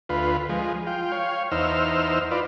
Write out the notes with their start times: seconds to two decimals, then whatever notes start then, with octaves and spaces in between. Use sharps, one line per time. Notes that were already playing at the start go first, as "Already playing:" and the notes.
0.09 D2 F4 B4
0.49 F3 G#3
0.87 F4 G5
1.12 C#5 F5
1.51 E2 D#4 C5 E6 F6
2.31 F4 B4 D5